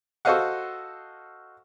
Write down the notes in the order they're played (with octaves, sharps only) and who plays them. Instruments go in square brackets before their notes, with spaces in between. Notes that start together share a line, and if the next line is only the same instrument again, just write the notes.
[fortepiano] F#4 A4 C5 D#5 F5 F#5